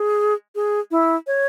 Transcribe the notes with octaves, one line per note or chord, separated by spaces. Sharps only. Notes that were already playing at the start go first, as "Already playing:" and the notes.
Already playing: G#4
G#4
E4
C#5